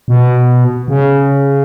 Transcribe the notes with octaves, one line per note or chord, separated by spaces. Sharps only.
B2
C#3